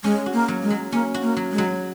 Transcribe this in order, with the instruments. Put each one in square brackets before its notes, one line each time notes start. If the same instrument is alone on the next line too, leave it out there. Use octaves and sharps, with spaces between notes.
[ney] G#3 [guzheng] C#4
[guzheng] F#4
[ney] A#3
[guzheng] F#3
[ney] G#3
[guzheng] F#3
[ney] A#3 [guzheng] C#4
[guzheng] F#4
[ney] A#3
[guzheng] F#3
[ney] G#3
[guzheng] F#3